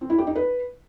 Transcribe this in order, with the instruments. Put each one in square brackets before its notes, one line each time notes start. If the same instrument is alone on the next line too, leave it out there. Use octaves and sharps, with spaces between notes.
[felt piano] C4
E4
G4
D#4
B4